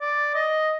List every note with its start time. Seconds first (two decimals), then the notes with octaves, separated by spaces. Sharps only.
0.01 D5
0.35 D#5